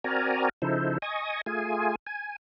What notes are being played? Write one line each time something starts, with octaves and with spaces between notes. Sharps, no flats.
C4 F#4 A#4 D5 G#5 A#5
C#3 F3 D#4 E4 A4 C5
D#5 G#5 C#6 D#6
A3 F4 G#4 G#5
G#5